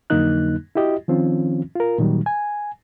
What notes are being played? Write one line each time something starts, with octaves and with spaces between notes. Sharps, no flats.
F2 D3 F#3 A#3 D#4 F#6
E4 F#4 G4 D#5
D#3 F3 C4 C#4 F4
F4 A#4
A#2 D#3 F#3 G3
G#5